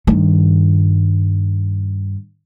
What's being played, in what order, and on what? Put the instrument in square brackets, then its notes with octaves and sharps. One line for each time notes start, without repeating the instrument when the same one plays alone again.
[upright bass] G2 D#3